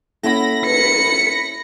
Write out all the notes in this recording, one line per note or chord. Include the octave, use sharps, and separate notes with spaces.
A#3 C#4 E4 A4 F#5 B5 A#6
B4 C#7